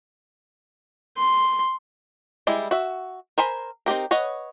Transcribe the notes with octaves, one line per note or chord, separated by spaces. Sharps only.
C6
G3 G#3 E4
F#4 E5
A#4 C5 G#5 B5
C4 D#4 G4 A#4
B4 C#5 D#5 F#5